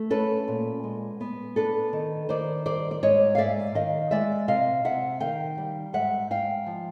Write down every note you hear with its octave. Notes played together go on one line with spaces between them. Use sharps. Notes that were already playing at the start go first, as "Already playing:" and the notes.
Already playing: A3
C#4 A4 B4
A#2
G#3
B3
D4 A4 B4
D#3
D#3 C5 D5
G3 C5 D5
D5
G#2 C#5 D#5
F5
G#2 D5 E5
D#3 D#5 F5
G#3 D5 E5
C3 D#5 F5
C3 E5 F#5
D#3 F5 G5
G3
G#2 E5 F#5
G#2 F5 G5
F3